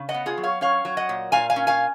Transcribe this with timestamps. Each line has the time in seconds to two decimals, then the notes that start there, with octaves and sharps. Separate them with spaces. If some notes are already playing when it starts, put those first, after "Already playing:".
Already playing: C#3
0.09 D#5 F#5
0.14 B3
0.26 F4 G#4
0.38 F#3
0.43 C#5 F5
0.61 C#4 C#5 F5
0.85 F#3
0.97 D#5 F#5
1.09 A#2
1.32 A#2 F5 G#5
1.50 F5 G#5
1.56 C#4
1.67 F5 G#5